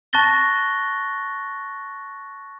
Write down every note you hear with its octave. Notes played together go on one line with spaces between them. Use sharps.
A5 C#6 F#6 A6 A#6 G7